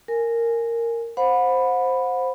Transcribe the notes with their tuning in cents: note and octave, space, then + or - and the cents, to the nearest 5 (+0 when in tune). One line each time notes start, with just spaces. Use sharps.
A#4 -10 G#5 +0
C5 +0 F#5 -35 B5 +0